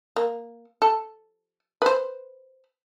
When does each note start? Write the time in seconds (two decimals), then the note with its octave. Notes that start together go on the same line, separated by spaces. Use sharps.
0.16 A#3
0.82 A4
1.82 B4 C5